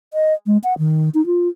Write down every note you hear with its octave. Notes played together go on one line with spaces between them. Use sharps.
D#5
G#3
F#5
D#3
D#4
F4